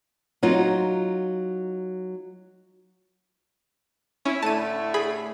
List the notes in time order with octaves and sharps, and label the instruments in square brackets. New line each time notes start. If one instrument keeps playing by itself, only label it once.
[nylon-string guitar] F#3 D#4 F4
[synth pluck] C#4 [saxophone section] E4
[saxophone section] A2 D3 A3 [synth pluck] A5 D#7
[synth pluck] G#4 B5